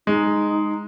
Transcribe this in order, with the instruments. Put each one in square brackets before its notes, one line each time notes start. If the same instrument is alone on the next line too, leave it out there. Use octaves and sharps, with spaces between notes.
[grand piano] G#3 [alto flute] D#4